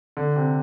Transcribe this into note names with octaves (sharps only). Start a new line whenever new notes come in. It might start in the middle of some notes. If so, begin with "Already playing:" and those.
D3
C3